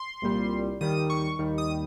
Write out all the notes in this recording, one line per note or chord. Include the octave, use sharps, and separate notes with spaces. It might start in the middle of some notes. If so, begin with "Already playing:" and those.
Already playing: C6
C2 A#2 G3
D#2 D#3 G3 D#6
C#6
D#2 D#3 G3
D#6